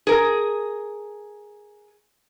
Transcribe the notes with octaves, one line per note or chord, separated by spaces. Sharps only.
G#4 A#4